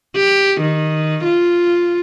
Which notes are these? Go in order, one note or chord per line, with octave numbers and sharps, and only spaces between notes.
G4
D#3
F4